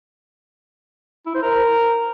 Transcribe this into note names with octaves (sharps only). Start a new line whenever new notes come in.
E4
C5
A#4